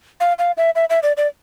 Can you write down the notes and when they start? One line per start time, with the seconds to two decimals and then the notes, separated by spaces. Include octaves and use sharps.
0.20 F5
0.39 F5
0.57 E5
0.75 E5
0.90 E5
1.03 D5
1.17 D5